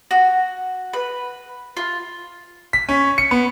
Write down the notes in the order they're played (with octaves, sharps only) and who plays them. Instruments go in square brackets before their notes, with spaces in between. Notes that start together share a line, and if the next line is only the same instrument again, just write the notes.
[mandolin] F#4
B4
F4
[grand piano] B6
C#4
C#7
B3